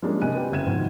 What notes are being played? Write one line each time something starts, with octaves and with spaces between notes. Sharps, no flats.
F3 G3 G#3 A#3 C#4 D4
C3 D4 D#5 G#5 F#6 D#7
C4 G4 B4
F#1 C#3 E5 G#6 D#7 E7
G#2 B2 D#3 F3